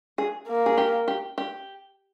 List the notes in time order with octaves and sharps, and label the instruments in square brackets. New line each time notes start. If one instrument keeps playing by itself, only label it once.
[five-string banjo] G#4
[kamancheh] A#3
[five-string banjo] G#4
G4
G4
G4